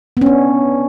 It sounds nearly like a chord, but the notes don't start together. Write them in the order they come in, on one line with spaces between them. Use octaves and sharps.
B3 C#4 D4